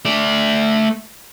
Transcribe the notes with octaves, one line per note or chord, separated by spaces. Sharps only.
A3 D5